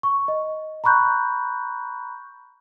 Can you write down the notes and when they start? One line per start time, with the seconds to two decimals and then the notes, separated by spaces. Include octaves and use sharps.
0.03 C#6
0.28 D#5
0.84 A#5 B5 C#6 F#6 G6